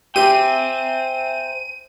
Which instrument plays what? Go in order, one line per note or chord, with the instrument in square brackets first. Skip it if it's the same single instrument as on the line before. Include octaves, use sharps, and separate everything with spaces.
[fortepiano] G4 [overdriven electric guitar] C5 G5 [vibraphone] E5 G#5 A#5 [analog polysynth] D#7